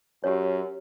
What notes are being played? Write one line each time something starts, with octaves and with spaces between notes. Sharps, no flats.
F#2 G4 C#5